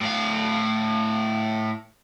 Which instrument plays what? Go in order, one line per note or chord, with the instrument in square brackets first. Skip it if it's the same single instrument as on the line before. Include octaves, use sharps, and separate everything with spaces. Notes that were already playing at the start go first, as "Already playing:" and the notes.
[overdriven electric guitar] A2 F5